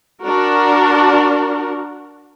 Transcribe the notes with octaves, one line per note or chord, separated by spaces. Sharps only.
D4 F#4 A#4